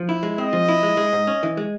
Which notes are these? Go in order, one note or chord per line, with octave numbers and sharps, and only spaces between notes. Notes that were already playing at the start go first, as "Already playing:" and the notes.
Already playing: F3
E4
G#3
C4 D#5
F3
E4
G#3
G#3
G#2
C#4
E3
G#3